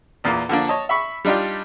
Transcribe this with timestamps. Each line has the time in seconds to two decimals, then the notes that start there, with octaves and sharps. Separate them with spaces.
0.24 E2 A#2 A#3
0.49 D3 F3 A#3 D4
0.68 C#5 D#5 A5
0.89 E5 B5 C#6
1.25 G3 D4 D#4 F4 G4